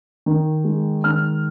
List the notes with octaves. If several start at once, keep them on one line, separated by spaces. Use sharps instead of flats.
D#3
G#3
D#3 F6